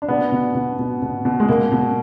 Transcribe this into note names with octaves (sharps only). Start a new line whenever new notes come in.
D4
B2 B3
B2
B2
B2
B2
B2
G#3
B2 A#3
B2